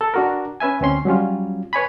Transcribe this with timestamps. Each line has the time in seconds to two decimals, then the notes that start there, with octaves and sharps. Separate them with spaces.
0.01 A4
0.14 D4 F#4 A#4
0.60 C#4 B4 E5 G#5
0.81 D2 C4 C#4 C6
1.05 F#3 G3 C#4 F4
1.73 B4 C#5 G#5 B5